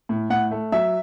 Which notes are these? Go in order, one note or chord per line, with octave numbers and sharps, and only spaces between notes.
A2
A2 F#5
A3
F#3 E5